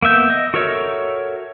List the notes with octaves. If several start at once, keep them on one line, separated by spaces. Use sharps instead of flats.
A#3 B3 E5 G6
D#5
F#4 A4 A#4 C#5 E5